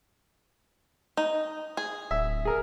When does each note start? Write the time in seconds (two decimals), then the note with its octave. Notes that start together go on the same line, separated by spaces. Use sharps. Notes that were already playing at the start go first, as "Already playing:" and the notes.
1.17 D#4
1.77 G#4
2.11 D1 E5
2.45 G#4 A#4